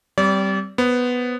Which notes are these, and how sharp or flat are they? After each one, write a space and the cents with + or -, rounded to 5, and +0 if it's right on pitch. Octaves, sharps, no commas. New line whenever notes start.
G3 -10 C4 -5 D5 -35
B3 +0 C5 +0